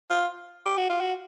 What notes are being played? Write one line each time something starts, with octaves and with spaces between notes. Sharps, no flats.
F4
G4
F#4
F4
F#4